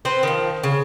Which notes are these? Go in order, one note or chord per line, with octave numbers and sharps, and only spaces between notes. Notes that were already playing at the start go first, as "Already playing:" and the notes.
C4 B4 C5
D#3 F3
C#3